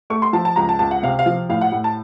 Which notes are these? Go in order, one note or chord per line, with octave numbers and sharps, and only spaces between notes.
A3 C#6
C6
F3 A5
A5
C#2 A#5
A5
C#2 A5
F#5
C3 F5
F5
F3
A2 F5
F#5
A2
A5